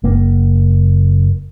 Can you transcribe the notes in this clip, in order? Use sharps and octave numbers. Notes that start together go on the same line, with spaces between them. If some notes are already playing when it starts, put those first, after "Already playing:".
F#1 A#3